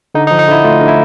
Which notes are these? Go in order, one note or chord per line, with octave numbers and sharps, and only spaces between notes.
D3 D#4
D#4
F3
D#4
D3 E4
A3 F4
D3
E4